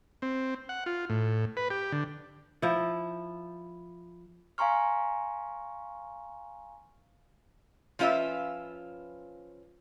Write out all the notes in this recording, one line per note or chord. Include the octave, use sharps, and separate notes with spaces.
C4
F#5
F4
A2
B4
G4
D3
F3 E4
F5 G#5 A#5 C6 C#6 F6
F3 C#4 F4 B4 E5